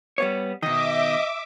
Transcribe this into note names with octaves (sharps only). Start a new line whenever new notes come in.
G3 B3 C#5
B2 D#3 D#5 E5 D6